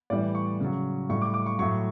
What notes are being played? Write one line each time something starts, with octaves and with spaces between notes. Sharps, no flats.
A2 E3 G3 D5
C#6
C#3 F#3
A2 G3 C#6
D6
D6
C#6
A2 F#3 C#6